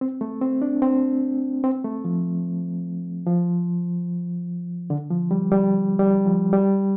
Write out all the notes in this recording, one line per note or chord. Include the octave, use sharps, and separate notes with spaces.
C4
A3
C4
D4
C4
C4
A3
F3
F3
D3
F3
G3
G3
G3
F3
G3